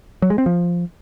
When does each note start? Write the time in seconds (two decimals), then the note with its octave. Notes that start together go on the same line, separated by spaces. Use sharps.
0.22 F#3
0.30 G#3
0.38 C4
0.46 F3